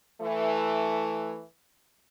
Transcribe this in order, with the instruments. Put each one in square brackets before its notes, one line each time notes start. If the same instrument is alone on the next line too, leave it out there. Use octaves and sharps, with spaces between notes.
[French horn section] E3 A3